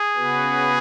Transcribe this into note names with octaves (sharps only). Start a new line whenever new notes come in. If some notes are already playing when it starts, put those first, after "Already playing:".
Already playing: G#4
C#3 B3 F#4 B4